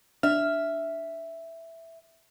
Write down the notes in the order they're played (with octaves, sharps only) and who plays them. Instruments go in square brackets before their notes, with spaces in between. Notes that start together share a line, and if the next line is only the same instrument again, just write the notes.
[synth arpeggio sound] D4 F6 [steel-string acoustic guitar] E5